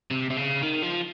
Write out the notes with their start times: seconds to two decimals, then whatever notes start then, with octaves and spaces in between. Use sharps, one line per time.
0.11 C3
0.30 C3
0.37 C#3
0.63 D#3
0.82 F3